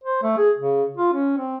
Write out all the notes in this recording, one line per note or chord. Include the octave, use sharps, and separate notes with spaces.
C5
A3
G#4
C#3
F4
C#4
C4